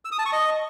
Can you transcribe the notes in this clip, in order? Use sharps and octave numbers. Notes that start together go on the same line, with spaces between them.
E6
D#6
A5
C#6
D#5